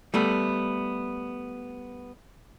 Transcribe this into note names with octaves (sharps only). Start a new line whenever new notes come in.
G3 A3 B3